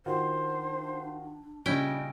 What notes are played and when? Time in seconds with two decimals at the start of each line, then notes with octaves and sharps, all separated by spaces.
0.06 D#3 D4 F4 F#4 C5
1.66 A#2 C#3 G3 C#4 E4 D#5 G5